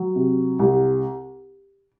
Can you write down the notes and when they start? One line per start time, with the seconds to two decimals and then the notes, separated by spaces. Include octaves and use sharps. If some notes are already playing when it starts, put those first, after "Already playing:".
Already playing: F#3
0.16 C3
0.59 C2